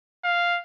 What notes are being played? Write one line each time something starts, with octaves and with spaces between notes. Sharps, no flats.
F5